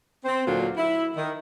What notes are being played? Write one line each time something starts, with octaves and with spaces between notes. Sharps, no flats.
C4 C5
D2 A#2 D3 F#3 D4 F4
E4
D#3